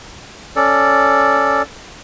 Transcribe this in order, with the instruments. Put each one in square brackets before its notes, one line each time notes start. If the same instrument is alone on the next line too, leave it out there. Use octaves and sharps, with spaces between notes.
[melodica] C#4 A4 D5